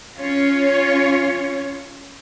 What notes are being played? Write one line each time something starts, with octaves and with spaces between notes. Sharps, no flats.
C#4 F4 C#5